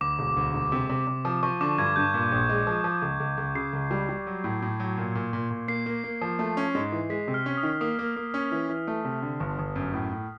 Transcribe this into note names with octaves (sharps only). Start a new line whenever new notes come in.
D2 D6
E1
D2
E1
C3
C3
C3
F3
F3 C#6
D3 D6
G2 G#6
G2 G6
A#2
A#1
G#3
F3
F3
C#2
C#2
C#2
C#3 C7
C#2
G3
G3
F#3
A2
A2
F#3
A#2
A#2
A#2
A#2
A#3 C7
A#3
A#3
F3
A3
C#4
G#2
E3
G#3 B6
C3
F6
C#4
D#6
D#3
A#3 D#6
A#3
A#3
C#4
E3
E3
A3
C3
D3
G1
G1
F#2
A2
A2